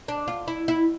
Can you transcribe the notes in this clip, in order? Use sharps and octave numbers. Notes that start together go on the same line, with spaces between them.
D4
F4
E4
E4